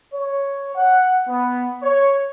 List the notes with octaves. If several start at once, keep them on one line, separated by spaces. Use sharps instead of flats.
C#5
F#5
B3
C#5